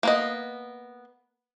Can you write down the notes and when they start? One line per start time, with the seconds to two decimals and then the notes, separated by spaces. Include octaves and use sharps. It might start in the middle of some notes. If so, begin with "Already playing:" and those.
0.03 A#3 B3 D#5